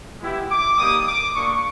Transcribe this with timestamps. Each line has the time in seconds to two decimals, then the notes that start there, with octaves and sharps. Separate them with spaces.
0.20 G#3 B3 E4 G4
0.50 D6
0.78 G3 A#3 D#4 G4 D#6
1.07 D6
1.35 G3 A#3 D4 C#6